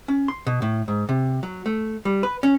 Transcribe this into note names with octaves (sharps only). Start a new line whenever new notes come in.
C#4
C6
B2
A2
G#2
C3
F#3
A3
G3
B4
C#4